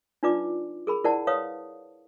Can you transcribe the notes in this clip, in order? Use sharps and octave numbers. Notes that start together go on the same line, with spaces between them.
D4 D#4 F4 B4 D5 D6
G#4 A#4 B5
E4 A#4 C5 D5 F#5 A5
B4 C#5 F5 D#6